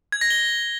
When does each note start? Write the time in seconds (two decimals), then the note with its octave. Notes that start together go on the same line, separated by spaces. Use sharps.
0.12 G#6
0.21 A#6
0.30 G7